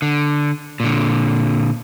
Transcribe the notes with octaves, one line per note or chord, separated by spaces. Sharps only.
D3
A#2 D3